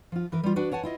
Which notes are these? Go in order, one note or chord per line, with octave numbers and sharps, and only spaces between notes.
F3 F4
E3 A#4 B4
G3 F4
D4 F#4 B4
C#5 F#5 G#5 A5
E4 F4 D#5